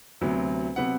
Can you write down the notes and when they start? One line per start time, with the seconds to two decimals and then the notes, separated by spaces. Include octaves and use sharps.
0.21 D2 C3 F#3 B3
0.76 C3 F#3 B3 F#5